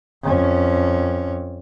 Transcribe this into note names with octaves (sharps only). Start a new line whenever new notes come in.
F2 C#4